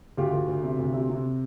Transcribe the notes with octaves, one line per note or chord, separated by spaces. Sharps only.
D2 F4 G4
D2
D2
C3
D2
C3
C3